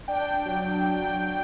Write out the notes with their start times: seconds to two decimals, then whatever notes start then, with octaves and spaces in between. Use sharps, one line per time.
0.08 D4 G5
0.45 F#3
0.82 D4
1.18 D4